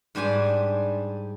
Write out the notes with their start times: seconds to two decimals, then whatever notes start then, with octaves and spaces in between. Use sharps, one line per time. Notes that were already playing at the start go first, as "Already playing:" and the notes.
0.15 G#2 G3 D4 C5 G#5